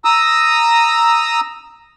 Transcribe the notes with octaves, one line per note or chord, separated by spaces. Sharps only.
A#5 D#6 E6